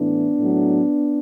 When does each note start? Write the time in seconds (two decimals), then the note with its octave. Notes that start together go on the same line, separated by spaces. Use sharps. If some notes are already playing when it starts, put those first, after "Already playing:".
Already playing: A2 E3 B3 D4
0.39 A2 F#3